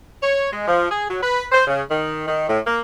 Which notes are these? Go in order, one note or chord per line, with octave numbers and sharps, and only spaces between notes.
C#5
G#3
F3
G#4
F#3
B4
C5
C#3
D#3
D#3
A2
A#3